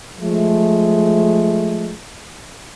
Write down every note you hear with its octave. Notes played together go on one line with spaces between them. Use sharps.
F3 G#3 A3